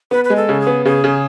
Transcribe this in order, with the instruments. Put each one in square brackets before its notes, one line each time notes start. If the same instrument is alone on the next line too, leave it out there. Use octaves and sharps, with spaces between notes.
[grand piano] B3 [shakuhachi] B4
[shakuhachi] B4
[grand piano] G#3
[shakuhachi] A4
[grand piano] C#3
[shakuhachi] G#4
[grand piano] B3
[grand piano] C#3 [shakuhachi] G#4
[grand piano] C#3